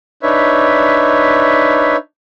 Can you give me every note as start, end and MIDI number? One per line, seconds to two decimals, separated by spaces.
0.23 1.97 62
0.23 1.97 63
0.23 1.97 71
0.23 1.97 73
0.23 1.97 76